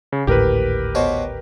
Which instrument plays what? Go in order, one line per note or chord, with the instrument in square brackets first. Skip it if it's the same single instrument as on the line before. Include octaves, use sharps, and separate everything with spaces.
[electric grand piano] C#3
[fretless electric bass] G#1 D2 A2 [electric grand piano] G4 A#4 B4
[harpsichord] B2 C5 C#5